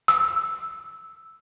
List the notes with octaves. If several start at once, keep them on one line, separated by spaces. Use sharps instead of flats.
E6